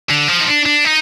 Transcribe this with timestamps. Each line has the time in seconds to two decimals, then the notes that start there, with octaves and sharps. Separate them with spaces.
0.09 D3
0.28 F3
0.40 D#4
0.47 D4
0.66 D4
0.85 D#4